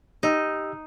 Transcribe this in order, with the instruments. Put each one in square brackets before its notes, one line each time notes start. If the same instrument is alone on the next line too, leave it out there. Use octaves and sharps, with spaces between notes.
[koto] D#4 [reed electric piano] G4 D#5 E6